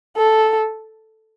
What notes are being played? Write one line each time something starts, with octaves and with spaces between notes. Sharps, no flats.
A4